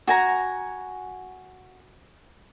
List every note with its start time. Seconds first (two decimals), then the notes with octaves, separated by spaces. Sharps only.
0.08 F#4 G#5 A#5